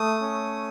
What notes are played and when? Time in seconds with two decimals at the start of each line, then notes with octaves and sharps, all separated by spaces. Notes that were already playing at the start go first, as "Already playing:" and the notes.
Already playing: A3 D#6
0.21 C#4